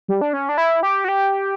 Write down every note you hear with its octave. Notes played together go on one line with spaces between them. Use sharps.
G3
D4
C#4
D4
E4
G4
F#4
G4